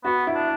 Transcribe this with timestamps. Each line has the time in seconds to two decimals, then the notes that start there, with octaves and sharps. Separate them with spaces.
0.05 B3 F#4
0.27 E4
0.35 D4